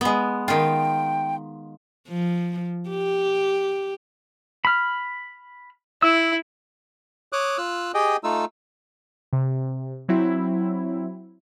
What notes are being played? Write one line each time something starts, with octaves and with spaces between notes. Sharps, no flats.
G#3 B3
D#3 F4 G5
F3
G4
B5 F6
E4 E6
C#5 D6 D#6 F#6
F4 E6 F#6
G4 G#4 D#5 G5
A3 D#4 F4 E6
C3
F#3 C4 E4